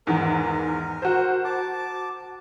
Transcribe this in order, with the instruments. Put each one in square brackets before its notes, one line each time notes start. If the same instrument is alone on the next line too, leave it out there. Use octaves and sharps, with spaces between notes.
[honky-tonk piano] E2 G#2 D#3 [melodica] A#4
[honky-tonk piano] F#4 C5
[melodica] A5 D6